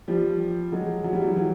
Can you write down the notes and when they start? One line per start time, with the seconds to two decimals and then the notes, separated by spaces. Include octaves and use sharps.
0.08 F3 G3
0.72 F#3 G#3
1.04 F#3
1.13 G3
1.22 E3 F#3
1.36 E3 F#3